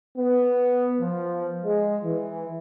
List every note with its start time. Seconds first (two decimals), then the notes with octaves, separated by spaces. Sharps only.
0.17 B3
1.00 F3
1.64 G#3
2.04 E3